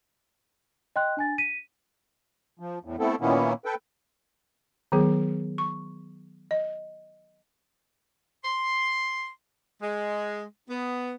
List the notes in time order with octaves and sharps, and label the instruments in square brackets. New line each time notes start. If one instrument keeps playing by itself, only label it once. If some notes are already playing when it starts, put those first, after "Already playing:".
[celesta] D#5 G5 C6 F#6
D4 G#5 A6
B6 D#7
[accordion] F3
E2 A2
A3 B3 C4 E4 A4
A#2 D#3 A#3 B3 C#4 E4
A4 B4 G5
[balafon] D#3 F#3 B3 G#4
C#6
D#5
[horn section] C6
G#3
B3